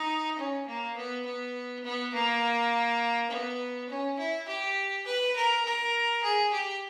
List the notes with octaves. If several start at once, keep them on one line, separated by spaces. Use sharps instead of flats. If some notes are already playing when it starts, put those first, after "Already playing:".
Already playing: D#4
C#4
A#3
B3
B3
B3
A#3
B3
C#4
E4
G4
B4
A#4
A#4
G#4
G4